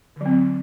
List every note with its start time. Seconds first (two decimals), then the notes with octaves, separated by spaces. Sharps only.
0.16 D3
0.21 F#3
0.26 C4